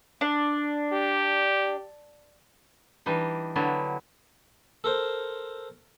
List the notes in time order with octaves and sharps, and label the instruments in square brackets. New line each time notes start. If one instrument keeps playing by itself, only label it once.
[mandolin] D4
[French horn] G4
[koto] E3 G3 D4 D#4
D3 F#3 G3 B3 E4
[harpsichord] A4 A#4 C5